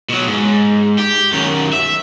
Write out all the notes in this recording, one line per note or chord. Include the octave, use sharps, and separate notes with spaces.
B2 F#3
G#2
G4
F#2 D#3
E5